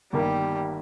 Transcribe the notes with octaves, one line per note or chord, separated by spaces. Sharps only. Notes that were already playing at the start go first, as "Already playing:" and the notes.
G1 G2 D#3 G3 A#3 G4